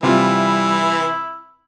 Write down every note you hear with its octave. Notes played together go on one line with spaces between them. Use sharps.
C3 E3 G3 E4 F4